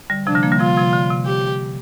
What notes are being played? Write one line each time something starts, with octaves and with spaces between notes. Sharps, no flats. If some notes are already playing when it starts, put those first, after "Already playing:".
D3 G3
C3 F3 D4
D3 G3
F3 A#3
D3 G3
C3 F3 F4
C3 F3
D3
C3
G4